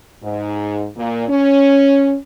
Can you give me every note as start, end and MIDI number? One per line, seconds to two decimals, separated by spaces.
0.23 0.88 44
0.97 1.25 46
1.29 2.17 61